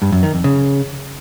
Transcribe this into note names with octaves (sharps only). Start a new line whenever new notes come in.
G2
F#2
D#3
F2
C#3